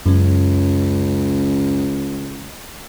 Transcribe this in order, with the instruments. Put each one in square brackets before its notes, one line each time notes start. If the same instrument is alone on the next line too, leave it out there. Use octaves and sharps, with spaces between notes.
[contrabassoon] C#2 [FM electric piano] F#2 C#4